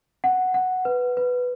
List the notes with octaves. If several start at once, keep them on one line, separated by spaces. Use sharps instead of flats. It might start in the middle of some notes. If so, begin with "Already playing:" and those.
F#5
F#5
B4
B4